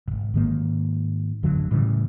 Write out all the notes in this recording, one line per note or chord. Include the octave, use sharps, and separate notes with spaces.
D#1 G#1
G#2 D#3 A#3
D1 F#2 D3 F#3
A2 C#3 E3 G3